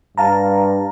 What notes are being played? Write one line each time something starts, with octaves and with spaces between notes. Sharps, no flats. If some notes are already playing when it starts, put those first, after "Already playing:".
G2 F5 A5 A#5